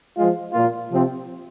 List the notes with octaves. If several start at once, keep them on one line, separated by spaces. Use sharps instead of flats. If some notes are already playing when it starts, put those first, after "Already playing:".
F3 G#3 F4
A#2 A#3 F4
C3 F3 C4 F4